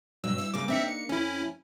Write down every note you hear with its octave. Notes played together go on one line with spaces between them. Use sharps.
G2 B2 F#3 E6
G3 E4 E5
C#3 G3 A#3 D6
A#3 C4 D4 D#4 E5 C#7
C#7
F2 C#4 E4